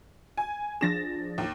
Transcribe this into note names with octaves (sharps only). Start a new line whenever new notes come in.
G#5
F3 D4 G#4 A6 A#6 E7
D#2